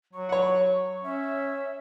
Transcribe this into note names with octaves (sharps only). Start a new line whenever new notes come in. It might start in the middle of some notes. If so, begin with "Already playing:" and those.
F#3 C#6
C#5 F#5
C#4 E5